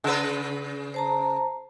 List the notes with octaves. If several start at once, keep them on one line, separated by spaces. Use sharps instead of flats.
C#3 B4
C5 A5 A#5